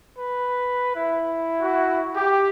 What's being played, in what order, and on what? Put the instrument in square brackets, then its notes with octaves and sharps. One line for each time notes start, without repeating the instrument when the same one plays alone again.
[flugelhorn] B4
E4
[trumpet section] F#4
G4